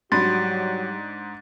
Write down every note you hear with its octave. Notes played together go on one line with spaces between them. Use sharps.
G#2 F#3 G3 D4 F#4 B5 C6 A6